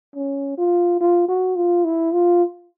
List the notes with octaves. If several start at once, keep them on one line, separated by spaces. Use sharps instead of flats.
C#4
F4
F4
F#4
F4
E4
F4